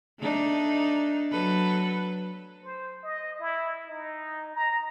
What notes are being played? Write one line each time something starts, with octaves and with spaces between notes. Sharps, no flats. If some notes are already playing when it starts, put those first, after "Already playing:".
A3 D4 D#4
F#3 A4 B4
C5
D#5
E4
D#4
A#5